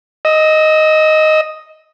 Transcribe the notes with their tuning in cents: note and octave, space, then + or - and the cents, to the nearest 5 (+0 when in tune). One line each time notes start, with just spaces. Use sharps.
D#5 +0 E6 -35